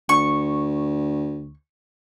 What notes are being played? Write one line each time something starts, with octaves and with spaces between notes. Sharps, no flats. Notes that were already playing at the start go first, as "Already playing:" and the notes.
D2 C#6